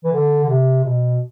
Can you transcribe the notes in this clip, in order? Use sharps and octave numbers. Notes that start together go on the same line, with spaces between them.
E3
D3
D3
C3
B2